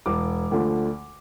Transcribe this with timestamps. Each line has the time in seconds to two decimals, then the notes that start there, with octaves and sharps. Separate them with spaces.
0.06 E1 D6
0.51 D2 D3 F3